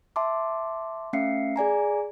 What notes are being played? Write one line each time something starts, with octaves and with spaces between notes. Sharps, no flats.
E5 A5 C6 D6
A3 C#4 E5 F5 C7 C#7
G#4 D5 G#5 A#5